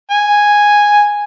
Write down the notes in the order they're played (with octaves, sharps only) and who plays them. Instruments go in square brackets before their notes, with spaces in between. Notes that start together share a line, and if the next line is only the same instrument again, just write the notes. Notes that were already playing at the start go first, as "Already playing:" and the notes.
[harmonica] G#5